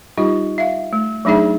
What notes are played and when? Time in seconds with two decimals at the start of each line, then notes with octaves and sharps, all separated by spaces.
0.17 G3 D#4 F4 G4
0.58 E5 F5
0.93 A3
1.25 F#3 A3 D4 D#4 G#4 E5